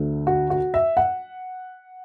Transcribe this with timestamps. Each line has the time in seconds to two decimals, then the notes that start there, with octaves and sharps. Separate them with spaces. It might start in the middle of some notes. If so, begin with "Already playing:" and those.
Already playing: D2 D3 A3
0.27 F#4
0.50 F#4
0.74 E5
0.97 F#5